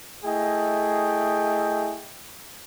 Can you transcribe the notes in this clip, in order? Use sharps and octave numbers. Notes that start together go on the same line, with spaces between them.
A3 E4 G#4 D#5 G5